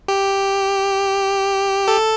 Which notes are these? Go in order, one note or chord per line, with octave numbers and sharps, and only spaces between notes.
G4
A4